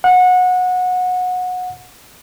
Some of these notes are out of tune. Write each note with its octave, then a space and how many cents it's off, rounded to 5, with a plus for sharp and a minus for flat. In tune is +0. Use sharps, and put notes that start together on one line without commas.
F#5 -20